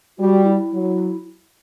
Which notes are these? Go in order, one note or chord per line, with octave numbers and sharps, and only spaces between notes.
G3 F#4
E4
F#3